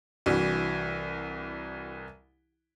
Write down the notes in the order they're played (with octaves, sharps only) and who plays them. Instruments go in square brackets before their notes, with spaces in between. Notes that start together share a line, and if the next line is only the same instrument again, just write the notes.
[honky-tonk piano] C2 E3 [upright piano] D4 F#4